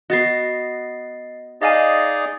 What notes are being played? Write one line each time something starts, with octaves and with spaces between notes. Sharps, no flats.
B3 F#4 D#5 A6 C7
D#4 G#4 D5 D#5 F5 G#5